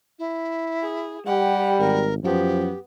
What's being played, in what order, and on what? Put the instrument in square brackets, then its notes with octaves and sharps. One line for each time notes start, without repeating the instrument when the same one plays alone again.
[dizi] E4
[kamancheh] G#4
[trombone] G3 [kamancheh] G4 F#5
[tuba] G#1 [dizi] A#4
[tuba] F#2 [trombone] F3 [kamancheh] B3 [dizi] G4